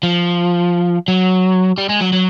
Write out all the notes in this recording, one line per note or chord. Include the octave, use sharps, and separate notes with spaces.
F3
F#3
G3
G#3
F#3
F#3